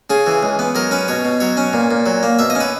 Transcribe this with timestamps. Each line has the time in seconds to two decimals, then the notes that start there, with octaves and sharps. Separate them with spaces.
0.10 C#3 G#4
0.26 E3
0.43 C#2
0.59 B3
0.75 F#3 A#4
0.91 C#4 B4
1.08 B2 C#5
1.25 B2
1.40 F#3 C#5
1.57 C#4
1.73 A#2
1.91 A#2
2.06 F#3
2.23 A#3
2.39 B2 E5
2.50 D#5
2.55 C#4
2.60 B4